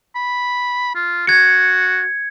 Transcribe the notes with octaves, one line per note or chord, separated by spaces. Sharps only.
B5
F4
F#4 G#6 C#7